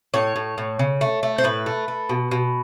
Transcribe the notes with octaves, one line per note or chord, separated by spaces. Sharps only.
A2 C#5
A2
A2
C#3
A3
A3
C5
A2 B4
A3
A3
B2
B2